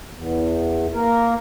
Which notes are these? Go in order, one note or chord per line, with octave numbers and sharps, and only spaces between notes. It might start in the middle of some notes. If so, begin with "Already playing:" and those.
E2
A#3 A#4